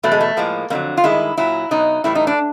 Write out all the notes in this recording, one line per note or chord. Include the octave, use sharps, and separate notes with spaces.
E2 B2 F#3 A3
G#3
A3
A2 F3 G#3 A#3
F2 D3 F#3 A#3
F4
G2 D#3 G#3 E4
A#2 F#3 E4
B2 F#3 D#4
A2 E3 G3 E4
D#4
D4